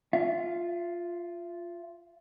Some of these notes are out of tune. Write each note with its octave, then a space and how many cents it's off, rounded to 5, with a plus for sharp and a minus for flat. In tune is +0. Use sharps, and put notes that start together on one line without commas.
F4 +0 E5 +40